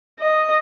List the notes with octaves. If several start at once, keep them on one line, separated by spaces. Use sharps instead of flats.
D#5